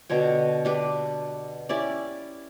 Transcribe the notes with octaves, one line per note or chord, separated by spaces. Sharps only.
B2 D3 C#5 G5
D4 G4 B4
C#4 E4 G4 D5